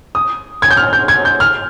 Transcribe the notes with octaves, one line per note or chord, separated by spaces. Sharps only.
D#6
G#6
G6
F6
G6
G#6
G6
F6